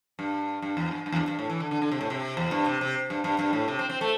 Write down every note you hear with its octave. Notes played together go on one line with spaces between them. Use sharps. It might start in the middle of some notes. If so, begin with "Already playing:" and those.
G2
G2
E2
G2
G2
E2
G2
G2
A2
E3
D3
D3
D3
C3
A2
C3
E2
G2
C3
C3
G2
G2
G2
A2
C3
C4
C4
A3